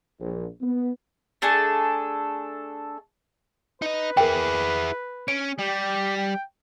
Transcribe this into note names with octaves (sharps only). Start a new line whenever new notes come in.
A#1
B3
A3 D4 G#4 A4
D#4 B4 D#5
E4 G#4 A#4 G5
C#4 D7
G3 G4
G5